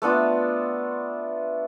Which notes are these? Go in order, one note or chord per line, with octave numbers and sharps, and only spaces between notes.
A3 B3 D4 F4